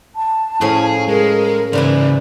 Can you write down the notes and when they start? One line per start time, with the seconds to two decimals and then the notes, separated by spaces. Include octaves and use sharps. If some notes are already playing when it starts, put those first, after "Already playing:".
0.16 A5
0.61 A2 F3 C#4 E4 G#4
1.08 G#3 G#4 A#4
1.73 G#2 C#3 E3 A#3 E4 D5